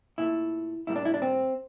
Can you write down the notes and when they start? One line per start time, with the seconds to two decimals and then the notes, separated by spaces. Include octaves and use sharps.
0.18 A#2 A3 E4
0.87 A2 G3 A#3 E4
0.96 D4
1.05 E4
1.14 D4
1.22 C4